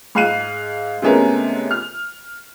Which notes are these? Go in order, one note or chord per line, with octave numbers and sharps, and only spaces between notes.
G#2 F5 F#6 D#7
C3 G#3 A3 B3 C#4 A#4
F6